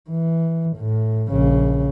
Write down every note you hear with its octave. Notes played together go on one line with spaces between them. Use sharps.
E3
A2
A#1 C#3